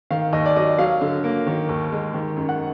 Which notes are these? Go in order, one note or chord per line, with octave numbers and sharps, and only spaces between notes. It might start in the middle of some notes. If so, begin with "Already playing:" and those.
D#3 F5
D#2 D#5
D5
F#3 D#5
F#3 F5
D3
A#3
D#3
D#2
G#3
D#3
F#2
F#5